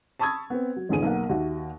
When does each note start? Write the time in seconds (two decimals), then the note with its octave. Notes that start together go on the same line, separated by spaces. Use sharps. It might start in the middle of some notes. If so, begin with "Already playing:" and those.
0.19 A5 B5 C#6 D#6 E6 G#6
0.50 B3 C4
0.76 F#3
0.89 G#1 E2 D3 G#4 G#5 D#7
1.02 B1 A#3 F#5
1.29 D#2 F#4 E5